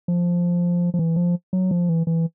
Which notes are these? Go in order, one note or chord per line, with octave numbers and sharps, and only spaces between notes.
F3
F3
E3
F3
F#3
F3
E3
E3